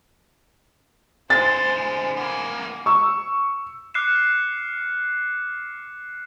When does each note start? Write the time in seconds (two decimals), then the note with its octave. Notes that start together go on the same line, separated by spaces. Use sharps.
1.30 D3 G#4 C5 A6
2.17 A#3 B3 G#5
2.86 C#6 E6
3.94 D6 F6 F#6 C7 C#7 E7